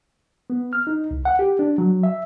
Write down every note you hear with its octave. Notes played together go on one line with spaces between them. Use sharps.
B3
F6
D#4
C2
F#5
G4
D4
F#3
E5